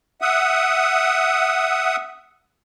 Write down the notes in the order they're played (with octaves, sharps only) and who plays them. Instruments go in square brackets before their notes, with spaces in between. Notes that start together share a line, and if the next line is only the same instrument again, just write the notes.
[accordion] E5 F#5 D#6